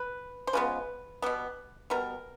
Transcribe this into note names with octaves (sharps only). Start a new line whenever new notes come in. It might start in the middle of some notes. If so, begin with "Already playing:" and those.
Already playing: B4
C5
C#3 F3 G#3 B3 B4
B2 G3 B3
B2 G3 B3 A#4